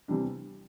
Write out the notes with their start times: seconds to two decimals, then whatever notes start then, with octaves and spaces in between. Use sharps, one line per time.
0.08 C3 E3 G3 D4